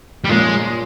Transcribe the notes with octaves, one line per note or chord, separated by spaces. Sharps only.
G3
A#2 F3 G#3 A#3 C#4